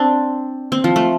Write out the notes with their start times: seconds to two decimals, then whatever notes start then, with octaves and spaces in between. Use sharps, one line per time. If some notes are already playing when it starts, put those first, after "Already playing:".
Already playing: C4 D4
0.72 C4
0.84 F3
0.96 A3